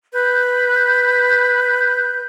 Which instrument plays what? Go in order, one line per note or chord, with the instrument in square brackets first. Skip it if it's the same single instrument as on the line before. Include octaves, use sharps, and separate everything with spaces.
[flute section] B4 G6